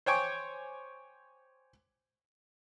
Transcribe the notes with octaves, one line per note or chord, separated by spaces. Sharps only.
C5 C#5 G5 G#5 C#6 D6